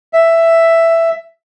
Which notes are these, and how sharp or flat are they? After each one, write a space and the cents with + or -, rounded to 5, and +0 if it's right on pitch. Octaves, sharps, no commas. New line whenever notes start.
E5 +5